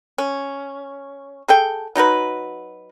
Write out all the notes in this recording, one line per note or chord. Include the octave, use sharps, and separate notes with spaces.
C#4
G#4 A4 G5
F#3 D#4 F#4 B4